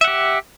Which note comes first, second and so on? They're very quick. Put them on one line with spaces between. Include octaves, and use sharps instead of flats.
E5 F#5 G4